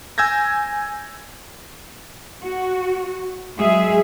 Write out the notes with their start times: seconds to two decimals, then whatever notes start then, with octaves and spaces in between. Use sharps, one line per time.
0.18 G#5 E6 G6 G#6 A#6
2.42 F#4
3.56 F#3 G#3 G#4 E5